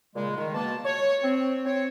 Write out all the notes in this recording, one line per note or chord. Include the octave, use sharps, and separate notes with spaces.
A#2 C#3 G#3
D#3
B2 A#3 A5
C#5
C4
C4 C#5